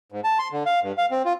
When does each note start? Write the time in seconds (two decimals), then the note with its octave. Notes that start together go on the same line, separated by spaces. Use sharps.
0.12 G#2
0.24 A5
0.39 C6
0.52 D3
0.66 F5
0.83 G2
0.98 F5
1.11 C4
1.25 F4